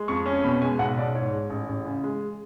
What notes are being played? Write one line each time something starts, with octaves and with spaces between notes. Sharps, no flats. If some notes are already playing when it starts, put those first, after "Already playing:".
Already playing: G#3
F2 C#6
C#4
B2 B5
G#3 G#5
B1 F#5
B1 D5
G#2 C#5
G#3
A1
A1
C#3
G#3